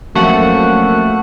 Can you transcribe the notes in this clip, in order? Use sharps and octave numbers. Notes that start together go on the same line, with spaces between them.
F#2 F3 A3 A#3 C4 F#5 C#6